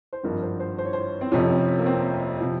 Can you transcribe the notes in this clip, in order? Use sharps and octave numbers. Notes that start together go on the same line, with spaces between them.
C5
G#1 G2 F3 A#4
C5
C5
C5
C#5
C5
C4
F1 F2 C3 F3 C#4
A#3
C4
C3 F3